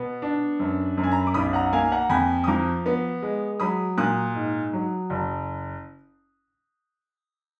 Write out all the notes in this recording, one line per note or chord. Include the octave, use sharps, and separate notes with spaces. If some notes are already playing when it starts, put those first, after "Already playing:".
Already playing: B2 B3
D4
F#2
F#2
G#5
A#5
B5
D6
B1 B5 D#6
F#5 A#5
A#3 F5 G#5
F#5 A#5
F2 G#5 B5
D#6
F3 A#5 D6
B3
G#3
F#3 B5 D#6
A#2 D#6 F#6
G#2
F#3
F#1